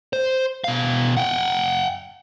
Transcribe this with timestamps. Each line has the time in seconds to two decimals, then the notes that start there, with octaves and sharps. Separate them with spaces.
0.13 C5
0.64 B2 F5
1.17 F#5 G5